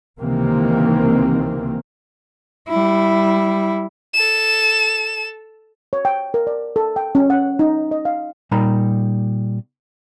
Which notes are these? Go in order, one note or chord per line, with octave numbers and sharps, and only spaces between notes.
C#2 C3 D#3 E3 A#3 C4
G3 E4
A4 E7
C#5
G5
A#4
D5
A4
G5
C#4
F#5
D#4
D#5
F5
A#2 G3 D#4 A#4 A#5 B5